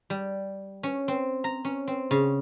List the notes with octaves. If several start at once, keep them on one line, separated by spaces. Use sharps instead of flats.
G3
C#4
C4
A#5
C#4
C4
C#3